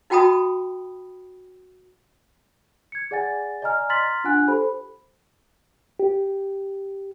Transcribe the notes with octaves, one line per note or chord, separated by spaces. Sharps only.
D#4 F#4 G5 A5 B5 D#6
G#6 C#7
G#4 D5 F#5 G#5 A6
D5 D#5 G#5 A#5 F6
A#5 C6 F6 A6 B6 F#7
D4 F4 F#5 G#5 F#6
G4 A4 C5 B5
G4